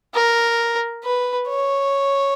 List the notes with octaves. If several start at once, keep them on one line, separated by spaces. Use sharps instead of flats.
A#4
B4
C#5